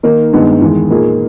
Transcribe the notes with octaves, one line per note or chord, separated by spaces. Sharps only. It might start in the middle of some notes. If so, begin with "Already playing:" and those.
D#3 A#3 D#4 A#4
G2 D#3 G#3 B3 D#4
E2 D#3 G#3
A#2 A#3 D#4 G#4